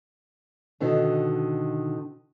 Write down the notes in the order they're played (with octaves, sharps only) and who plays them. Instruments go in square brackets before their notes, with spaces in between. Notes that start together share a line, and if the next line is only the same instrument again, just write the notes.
[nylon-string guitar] B2 D3 D#3 F#4